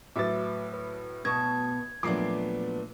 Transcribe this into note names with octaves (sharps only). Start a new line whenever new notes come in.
A2 F#3 B4 E5 D6 A6
B4
B2 A5 C#6 D#6 G#6
A#2 F3 F#3 A3 B3 D4 D6 C7